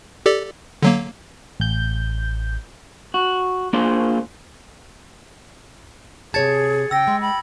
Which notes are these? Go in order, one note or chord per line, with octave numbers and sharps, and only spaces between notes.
G4 A4 D5
D3 F#3 A#3
A1 G6
F#4
A#3 D4 F4 G#4 C5
C3 G#4 C#5 A5 G#6 A6 C#7
C#3 G5 E6 A#6
G#3 C6
G5 B5